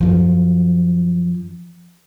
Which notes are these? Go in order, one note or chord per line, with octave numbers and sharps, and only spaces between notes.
F#2 F3